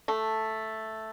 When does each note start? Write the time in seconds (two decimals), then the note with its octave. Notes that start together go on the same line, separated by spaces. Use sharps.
0.08 A3